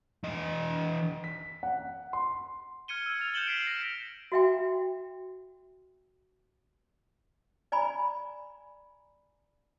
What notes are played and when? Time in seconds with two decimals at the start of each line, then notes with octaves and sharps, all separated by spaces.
0.24 E3 D#5
1.24 B6
1.63 F#5
2.13 C6
2.88 F6 G#6 C#7 D#7 G7
3.06 E6 D#7
3.19 E6 F6 A6 F7
3.34 G6 C#7 E7 F#7 G7
3.47 B6 C7 D7
3.67 A#6 B6 E7
4.32 F#4 E5 G5
7.72 D5 G#5 A#5 B5